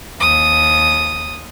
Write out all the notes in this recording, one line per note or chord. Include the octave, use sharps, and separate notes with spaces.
D#2 D#6